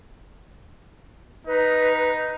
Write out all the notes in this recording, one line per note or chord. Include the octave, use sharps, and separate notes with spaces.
D#4 B4